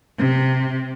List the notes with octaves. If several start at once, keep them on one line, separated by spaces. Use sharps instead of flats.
C3